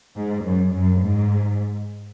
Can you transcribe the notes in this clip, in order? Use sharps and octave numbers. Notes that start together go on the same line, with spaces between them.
G#2
F#2
F#2
G#2